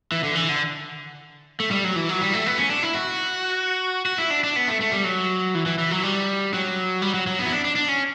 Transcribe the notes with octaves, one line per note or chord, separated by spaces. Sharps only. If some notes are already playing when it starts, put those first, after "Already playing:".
E3
D3
E3
D3
A3
G3
F#3
E3
F#3
G3
A3
B3
C#4
D4
E4
F#4
F#4
E4
D4
D4
B3
A3
A3
G3
F#3
E3
E3
E3
F#3
G3
F#3
G3
F#3
F#3
B3
E4
D4
D4
D4
C#4